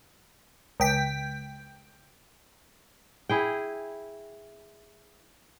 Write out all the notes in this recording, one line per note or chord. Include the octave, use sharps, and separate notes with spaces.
C#2 G5 B6
E4 G#4 G5